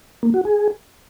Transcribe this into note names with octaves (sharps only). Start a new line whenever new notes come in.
A#3
F#4
G#4